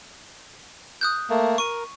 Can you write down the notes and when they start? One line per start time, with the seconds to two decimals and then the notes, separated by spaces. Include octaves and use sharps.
1.01 D#6 F#6 G6
1.30 A3 A#3
1.58 A#4 C#6 D#7